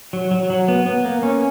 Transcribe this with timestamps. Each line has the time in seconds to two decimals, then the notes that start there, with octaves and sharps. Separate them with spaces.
0.13 F#3
0.31 F#3
0.50 F#3
0.68 B3
0.86 B3
1.05 A#3
1.23 C#4